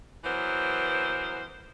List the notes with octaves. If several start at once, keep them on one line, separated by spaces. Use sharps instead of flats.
E3 F#3 B3 A#4 C5